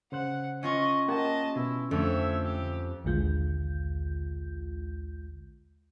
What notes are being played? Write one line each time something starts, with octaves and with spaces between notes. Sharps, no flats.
C#3 C5 F#5 F#6
C#4 F4 D#5 C#6
A#3 G4 D#5 F#5 A5
B2 E4
F2 D3 A3 D4 C#5 E5
G4
A#1 D#2 D3 G#3 F4 G6